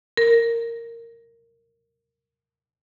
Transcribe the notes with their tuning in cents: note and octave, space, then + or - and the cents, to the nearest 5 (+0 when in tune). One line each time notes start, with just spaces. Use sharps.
A#4 -15